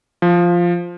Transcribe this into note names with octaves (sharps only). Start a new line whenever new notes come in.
F3